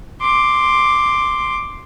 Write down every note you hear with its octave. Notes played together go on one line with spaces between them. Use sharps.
C6 D6